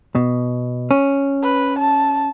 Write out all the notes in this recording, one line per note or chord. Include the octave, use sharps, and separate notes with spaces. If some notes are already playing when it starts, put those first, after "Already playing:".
B2
C#4
B4
A5